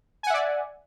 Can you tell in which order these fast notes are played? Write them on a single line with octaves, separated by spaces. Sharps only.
G#5 F#5 E5 D5